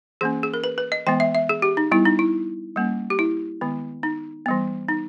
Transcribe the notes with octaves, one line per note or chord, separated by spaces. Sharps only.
E3 A#3 C#4 G#4
G#4
A#4
B4
B4
D#5
E3 G#3 B3 G5
E5
E5
G#4
G4
D#4
G3 B3 E4
D#4
E4
G3 A#3 C#4
G4
E4
D#3 G#3 B3
D#4
E3 G3 B3
D#4